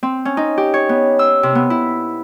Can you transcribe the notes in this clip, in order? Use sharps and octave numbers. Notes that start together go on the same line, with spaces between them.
C4
C#4
D#4
G4
C#5
B3
E6
C3
B3
E4